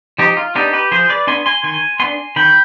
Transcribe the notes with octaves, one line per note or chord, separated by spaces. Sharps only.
F3 D#4 G4
F4
B3 D4 D#4 G4
G4 B4
F3 G#4 C5
B4 D5
B3 D4 G#5 C6
G#5 C6
D#3 G#5 C6
B3 D4 G#5 C6
D#3 G5 B5